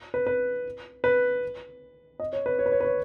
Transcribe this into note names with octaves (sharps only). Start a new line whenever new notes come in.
B4
B4
B4
D#5
C#5
B4
C#5
B4
C#5
B4
C#5